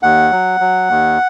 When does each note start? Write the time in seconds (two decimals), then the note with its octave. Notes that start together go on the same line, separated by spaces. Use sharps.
0.03 D#2 F#5
0.31 F#3
0.60 F#3
0.89 D#2